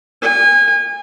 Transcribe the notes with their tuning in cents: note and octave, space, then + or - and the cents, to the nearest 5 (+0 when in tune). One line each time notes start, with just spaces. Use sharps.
G#5 -30